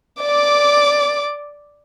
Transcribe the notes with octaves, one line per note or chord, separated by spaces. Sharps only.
D5 D6